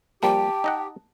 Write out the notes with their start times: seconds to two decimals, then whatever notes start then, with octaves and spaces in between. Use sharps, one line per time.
0.23 F3 G3 A#3 G4 G5 A5
0.64 D#4 D#5 F#5